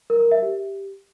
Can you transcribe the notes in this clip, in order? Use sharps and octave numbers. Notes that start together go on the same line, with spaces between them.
A#4
A#4
E5
G4